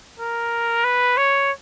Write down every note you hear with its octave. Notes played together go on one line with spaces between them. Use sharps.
A#4
B4
C#5